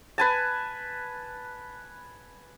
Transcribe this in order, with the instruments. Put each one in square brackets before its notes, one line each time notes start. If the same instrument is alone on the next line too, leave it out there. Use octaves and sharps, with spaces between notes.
[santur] B4 G#5 A5